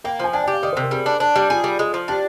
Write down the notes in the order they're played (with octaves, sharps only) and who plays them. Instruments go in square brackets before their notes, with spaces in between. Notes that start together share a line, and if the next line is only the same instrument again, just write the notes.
[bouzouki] A#3 [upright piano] G5
[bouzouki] F3 [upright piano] G#5
[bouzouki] D4 [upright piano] G#5
[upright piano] G#5
[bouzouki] G4
[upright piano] F5
[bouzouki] D#3 [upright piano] D5
[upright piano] C5
[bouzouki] C3 [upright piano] A#4
[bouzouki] G3 [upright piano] G#4
[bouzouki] D4
D4
[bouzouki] G3 [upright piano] G4
[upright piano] F4 [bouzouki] G#4
[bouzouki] G3
G#3
F3
[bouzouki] D4 [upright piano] G4